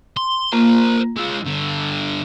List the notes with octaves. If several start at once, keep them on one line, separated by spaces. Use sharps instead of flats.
C6
A#3 F4 A#4 C5
G#3 F4 E6
G2 D3